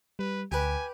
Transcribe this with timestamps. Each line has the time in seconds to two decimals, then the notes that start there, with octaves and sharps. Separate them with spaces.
0.19 G3 B4
0.52 D2 G4 B4 G#5